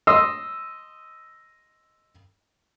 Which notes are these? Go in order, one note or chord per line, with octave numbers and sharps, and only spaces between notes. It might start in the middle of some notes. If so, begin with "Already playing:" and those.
D#5 C6 D#6 E6